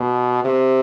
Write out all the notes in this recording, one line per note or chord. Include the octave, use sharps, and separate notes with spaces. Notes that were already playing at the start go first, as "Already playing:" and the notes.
Already playing: B2
C3